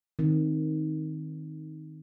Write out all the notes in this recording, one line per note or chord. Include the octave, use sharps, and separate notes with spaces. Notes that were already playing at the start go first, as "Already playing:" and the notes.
D#3 C4